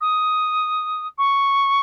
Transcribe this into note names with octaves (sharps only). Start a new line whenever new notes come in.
D#6
C#6